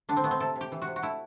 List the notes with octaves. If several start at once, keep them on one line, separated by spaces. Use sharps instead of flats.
D3 D4
C4
A3 B3
C4
C3 A4
C3
G4
E3
F#4
C3
F#4
A3 E4